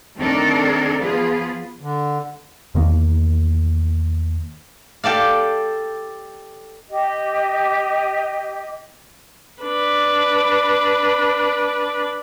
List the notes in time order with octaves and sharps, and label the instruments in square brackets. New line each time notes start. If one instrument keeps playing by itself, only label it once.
[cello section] D#3 A3 C4 D4 A4 A#4
F3 B3 F4 G#4 B4
[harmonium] D3
[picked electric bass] E2 D#3 A#3
[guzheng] G4 A4 D5 F5
[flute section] G4 D#5
[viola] D4 B4